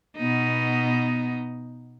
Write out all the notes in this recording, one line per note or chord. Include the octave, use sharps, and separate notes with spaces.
B2 B3 D#4